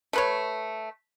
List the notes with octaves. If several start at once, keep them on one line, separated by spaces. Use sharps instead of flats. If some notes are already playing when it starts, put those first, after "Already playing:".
A3 B4 C#5